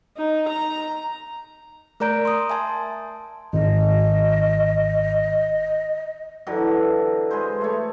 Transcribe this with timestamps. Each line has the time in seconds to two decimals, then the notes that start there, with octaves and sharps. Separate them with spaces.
0.17 D#4
0.48 A#5
2.00 A3 A#4 D5 A#5 G6 D7
2.25 C6 D#6
2.50 E5 G#5 A5 C6
3.53 G#1 D#5
6.47 D3 E3 F#3
7.31 G#3 G#4 B4 C5
7.61 A3 C#5